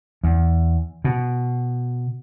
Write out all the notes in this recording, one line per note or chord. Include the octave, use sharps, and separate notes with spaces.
E2
B2